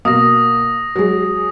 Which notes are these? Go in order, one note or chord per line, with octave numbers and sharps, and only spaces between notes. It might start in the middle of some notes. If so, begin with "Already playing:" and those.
B2 A#3 D#6 A#6
F#3 G#3